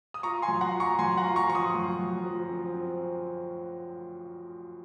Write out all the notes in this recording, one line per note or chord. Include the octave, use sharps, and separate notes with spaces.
D#6
F4 A#5 C#6
G#5 C6
F#2
F#5 A#5
F4
A#5 C#6
F#2 G#5 C6
F#5 A#5
F4
A#5 C#6
F3 C#6
C6 D#6
F#2
F#2
F3
C4
C4